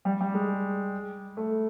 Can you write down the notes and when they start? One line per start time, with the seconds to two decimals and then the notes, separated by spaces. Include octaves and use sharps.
0.05 G3
0.21 G3
0.34 G#3
1.37 A3